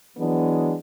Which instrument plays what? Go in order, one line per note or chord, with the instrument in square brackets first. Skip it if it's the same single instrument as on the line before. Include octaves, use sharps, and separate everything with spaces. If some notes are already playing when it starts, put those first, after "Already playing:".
[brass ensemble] E3 F#3 G#3 B3 D4